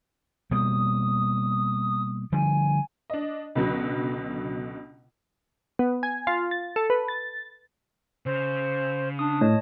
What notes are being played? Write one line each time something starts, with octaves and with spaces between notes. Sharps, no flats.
B2 G3 A#3 D#6
D3 F3 G3 G#5
D4 D#5
C#2 B2 D3 F#3
B3
G#5
F4
A6
A4
B4
A6
C#3 C5
D4 D#6
A2 C#5 D#5 A5